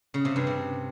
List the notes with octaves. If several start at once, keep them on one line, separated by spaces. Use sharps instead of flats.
C#3
C3
G2
C3